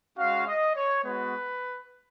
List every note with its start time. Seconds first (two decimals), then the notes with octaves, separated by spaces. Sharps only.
0.17 G#3 C#4 F#4 F5
0.46 D#5
0.75 C#5
1.03 G#3 B3 F#4 B4